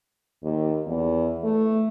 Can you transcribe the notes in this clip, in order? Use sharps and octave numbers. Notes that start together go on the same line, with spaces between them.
D#2
E2
A3